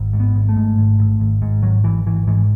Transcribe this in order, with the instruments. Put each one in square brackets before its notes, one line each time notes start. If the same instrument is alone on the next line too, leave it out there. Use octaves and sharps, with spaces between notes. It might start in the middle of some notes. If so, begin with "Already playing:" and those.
Already playing: [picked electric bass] G#1
G#2
B3
G#1
A3
G#2
G#1
G#1
G#1
G#2
G#1 F#3
G#1 E3
G#1 E3
G#2 E3